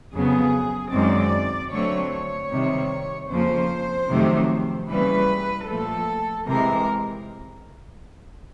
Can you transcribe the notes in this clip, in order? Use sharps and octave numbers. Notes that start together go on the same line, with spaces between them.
F2 C#3 F#3 B3 G#4
F#2 D#3 G#3 C4 D5
D3 F#3 A3 C4 C#5
C#5
C3 D#3 G3
F2 C#3 F3 A#3 C5
F2 C3 D#3 F#3 A3
C#3 E3 G3 A#3 B4
A#2 F3 A3 A4
C3 E3 G#3 A#4